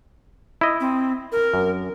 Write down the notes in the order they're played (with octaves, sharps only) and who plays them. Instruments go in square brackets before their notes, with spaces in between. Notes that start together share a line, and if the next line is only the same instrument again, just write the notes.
[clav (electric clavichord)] E4 D#5
[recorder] C4
A#4
[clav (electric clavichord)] F#2